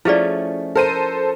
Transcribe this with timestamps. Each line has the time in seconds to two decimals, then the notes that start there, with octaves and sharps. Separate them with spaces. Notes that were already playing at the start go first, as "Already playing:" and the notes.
0.05 F3 A3 C#4 E4 G#4 D5
0.76 A4 A#4 C5 D#7